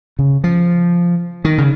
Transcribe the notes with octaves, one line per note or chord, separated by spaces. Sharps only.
C#3
F3
D#3
C#3